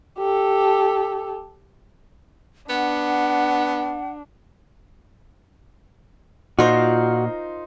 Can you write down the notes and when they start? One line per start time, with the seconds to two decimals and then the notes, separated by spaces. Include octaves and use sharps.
0.18 G4 A4
2.69 B3 D4 F#5
6.59 A#2 D#4 F4 F#4 A#4 C5 C6